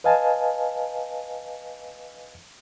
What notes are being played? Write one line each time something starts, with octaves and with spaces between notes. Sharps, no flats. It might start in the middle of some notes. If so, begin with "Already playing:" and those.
B4 D#5 F5 G#5 A5